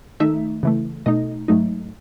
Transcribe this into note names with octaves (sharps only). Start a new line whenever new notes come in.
D#3 A3 D#4 E5
C#3 E3 A3
B2 A3 D#4 D#5
G#2 F#3 A3 D#4